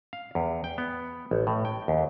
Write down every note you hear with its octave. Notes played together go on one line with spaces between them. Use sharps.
F5
E2
G5
B3
A1
A2
G5
D#2